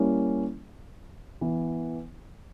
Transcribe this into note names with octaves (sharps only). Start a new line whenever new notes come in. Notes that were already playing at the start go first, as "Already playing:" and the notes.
Already playing: G3 A#3 C#4 E4
E3 B3 E4